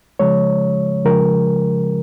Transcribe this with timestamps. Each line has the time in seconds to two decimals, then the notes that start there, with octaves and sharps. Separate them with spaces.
0.19 C#3 F3 G#3 C#5
1.04 C#3 F3 G#3 A#4